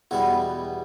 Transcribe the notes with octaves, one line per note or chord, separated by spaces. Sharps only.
E2 B2 G3 B3 F#4